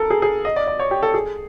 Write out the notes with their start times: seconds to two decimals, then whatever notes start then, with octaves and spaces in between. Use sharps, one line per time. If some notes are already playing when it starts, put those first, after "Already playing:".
Already playing: A4 A#4
0.10 G#4
0.22 G#4
0.45 D#5
0.56 D5
0.67 D5
0.79 C#5
0.91 G4
1.03 A4
1.14 G#4